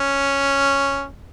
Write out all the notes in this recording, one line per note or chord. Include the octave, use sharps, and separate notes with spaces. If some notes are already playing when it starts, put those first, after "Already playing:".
Already playing: C#4